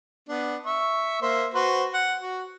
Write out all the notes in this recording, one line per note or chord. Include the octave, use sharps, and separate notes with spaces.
B3 D4
E5 C#6
A#3 C5 E5
F#4 B4 C5
F#5
F#4